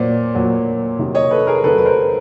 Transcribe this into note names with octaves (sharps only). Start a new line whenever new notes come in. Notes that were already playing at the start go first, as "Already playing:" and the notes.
Already playing: A#2 F#3 C5 D5
A#2 F#3
C3 D#3 F#3
C#5 D#5
A4 B4
G#4 A#4
C3 D#3 F#3 A4 B4
B4
A#4 C5